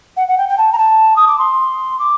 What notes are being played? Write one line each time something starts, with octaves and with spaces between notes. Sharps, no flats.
F#5
F#5
G5
G5
A5
A#5
A5
D#6
D6
C6
D6